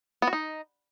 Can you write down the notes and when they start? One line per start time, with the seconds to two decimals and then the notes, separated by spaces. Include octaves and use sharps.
0.22 B3
0.28 F#4
0.33 D#4